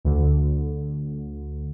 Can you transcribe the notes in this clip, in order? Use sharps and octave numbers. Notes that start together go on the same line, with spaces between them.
D2 D3